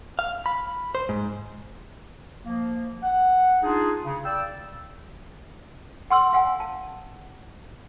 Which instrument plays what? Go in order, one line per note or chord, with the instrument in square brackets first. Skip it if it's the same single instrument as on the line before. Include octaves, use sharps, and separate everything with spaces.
[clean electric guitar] F5
B5
C5
G#2
[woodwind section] F3 A#3
F#5
D4 D#4 F4 G#4
C#3
D5 G5 E6
[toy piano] F#5 C6 E6
F5 F#5 G#5
A5